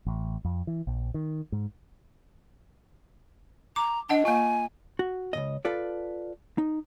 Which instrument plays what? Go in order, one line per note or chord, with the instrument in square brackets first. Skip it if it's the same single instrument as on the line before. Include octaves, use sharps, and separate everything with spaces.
[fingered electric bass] A1
F2
E3
A#1
D#3
G#2
[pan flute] A#5 [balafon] D6
[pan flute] D4 [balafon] D#5 F#5 A5
[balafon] A#3 F4 [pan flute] G#5
[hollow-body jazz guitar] F#4
C#2 A#2 D#5
F4 A4 B4 D5
D#4